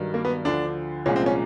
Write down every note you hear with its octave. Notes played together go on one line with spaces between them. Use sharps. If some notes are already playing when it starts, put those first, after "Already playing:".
Already playing: G2 D#3 F#3
A#3
B3
D2 D3 F3 D4
C2 A#2 F3 G#3 C#4
C4
C#4